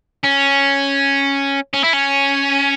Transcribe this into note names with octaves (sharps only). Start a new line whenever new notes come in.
C#4
C#4
E4
C#4